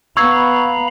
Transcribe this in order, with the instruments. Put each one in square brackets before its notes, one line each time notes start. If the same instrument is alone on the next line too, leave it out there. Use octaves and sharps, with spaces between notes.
[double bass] B3 [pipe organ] F5 A#5 B5 [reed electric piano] C#6 [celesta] E6 G#6